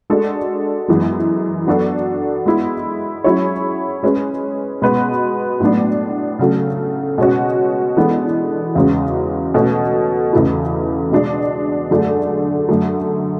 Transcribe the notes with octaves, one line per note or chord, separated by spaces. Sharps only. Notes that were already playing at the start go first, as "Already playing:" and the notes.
G#3 D4 F#4 A4
F#2 E3 G#3 B3
F#3 B3 D4 F#4 A4
G#3 B3 E4
F#3 C#4 E4 G#4 C#5
G#3 C#4 G#4 B4
B2 G#3 B3 F#4 B4
A2 F#3 B3 D4
C#3 F#3 A3
B2 G#3 C#4 F#4
E3 G#3 B3 D4 A4
E2 C#3 G#3 C#4 F#4
B2 A3 C#4 F#4
E2 C#3 E3 A3 E4
B2 G#3 D4
F#2 D3 A3 D4 G#4
F#2 D3 A3